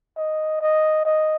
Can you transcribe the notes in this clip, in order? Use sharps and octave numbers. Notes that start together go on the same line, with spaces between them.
D#5
D#5
D#5